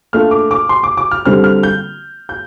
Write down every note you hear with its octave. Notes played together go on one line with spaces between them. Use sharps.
A#2 A3 D4 F4 F6
D6
D6
C6
D6
D6
F6
D3 G3 C4 F6
F6
G6
G6